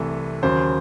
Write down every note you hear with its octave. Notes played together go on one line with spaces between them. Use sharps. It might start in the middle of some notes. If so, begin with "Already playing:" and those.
Already playing: C2 C3 E3 A3
D#2 C#3 F#3 C5